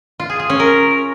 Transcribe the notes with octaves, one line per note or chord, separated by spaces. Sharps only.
F4
G#4
G#4
C#4
A#4